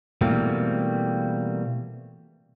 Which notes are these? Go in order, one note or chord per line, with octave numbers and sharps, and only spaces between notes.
B2 E3 G3 A3 A#3 C4